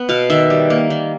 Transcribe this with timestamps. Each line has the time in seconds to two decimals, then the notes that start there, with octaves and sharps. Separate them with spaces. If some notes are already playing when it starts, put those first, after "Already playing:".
Already playing: B3
0.09 B2 F5
0.30 D#3 E5
0.50 G3
0.70 A#3
0.90 D#3